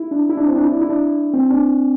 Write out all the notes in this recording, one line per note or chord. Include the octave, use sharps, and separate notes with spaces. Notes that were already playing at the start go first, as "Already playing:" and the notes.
Already playing: E4
D4
E4
D4
C4
D4
E4
D4
E4
D4
C4
D4